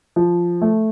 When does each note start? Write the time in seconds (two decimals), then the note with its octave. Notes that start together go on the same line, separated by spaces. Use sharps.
0.16 F3
0.62 A3